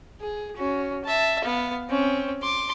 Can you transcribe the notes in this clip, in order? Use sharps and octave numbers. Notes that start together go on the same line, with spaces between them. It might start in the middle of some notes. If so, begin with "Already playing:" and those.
G#4
C#4 F#4
E5 A5
B3 F5
C4 C#4
C6 D6